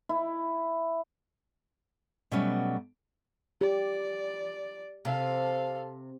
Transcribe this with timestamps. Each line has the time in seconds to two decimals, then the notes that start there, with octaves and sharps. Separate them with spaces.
0.09 E4
2.31 B2 F#3 G3 A3 B3 C#4
3.61 G4 D5
5.05 C3 A4 F5